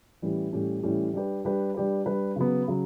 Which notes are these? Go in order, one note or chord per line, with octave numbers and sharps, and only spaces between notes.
A2 E3 G3 C#4 G4
A2 E3 G3 C#4 G4
A2 E3 G3 C#4 G4
G3 D4 G4 B4
G3 D4 G4 B4
G3 D4 G4 B4
G3 D4 G4 B4
C#3 F#3 B3
C#3 F#3